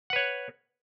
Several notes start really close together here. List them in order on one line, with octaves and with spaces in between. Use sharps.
F#5 B4 C#5